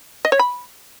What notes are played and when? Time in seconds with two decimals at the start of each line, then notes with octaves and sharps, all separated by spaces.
0.25 D#5
0.32 C#5
0.39 B5